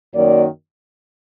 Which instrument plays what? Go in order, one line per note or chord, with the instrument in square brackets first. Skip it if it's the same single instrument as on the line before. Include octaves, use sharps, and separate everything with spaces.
[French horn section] F#2 D#3 F#3 A#3 D5